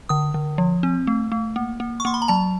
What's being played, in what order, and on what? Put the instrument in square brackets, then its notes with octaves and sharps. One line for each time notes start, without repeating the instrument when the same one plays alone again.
[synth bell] D3 D#6
D3
F3
C4
A3
A3
A#3
A#3
C#6
A#3 C6
B5
A#5
F#3 A5